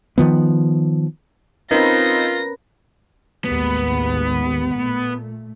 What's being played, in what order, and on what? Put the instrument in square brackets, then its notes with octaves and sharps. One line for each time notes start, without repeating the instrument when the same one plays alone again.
[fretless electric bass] D#3 F3 B3
[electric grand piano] C4 D#4 [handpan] C#4 A#4 B4 [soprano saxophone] F4 [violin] A#6
[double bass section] A1 D#2 G#3 [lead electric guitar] B3
[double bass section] A#2 A3